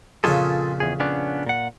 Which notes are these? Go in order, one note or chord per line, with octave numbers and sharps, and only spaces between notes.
F2 A#2 C#3 F4 G#4 A4
E2 G#4
B3 C#4 D4
A#2 F#5